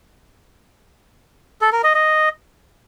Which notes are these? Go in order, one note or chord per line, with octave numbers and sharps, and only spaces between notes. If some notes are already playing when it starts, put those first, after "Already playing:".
A4
A#4
D#5
D#5